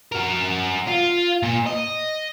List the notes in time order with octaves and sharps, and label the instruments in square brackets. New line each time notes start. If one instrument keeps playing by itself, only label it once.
[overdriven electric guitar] F#4 A#4
F4
A#2
D#5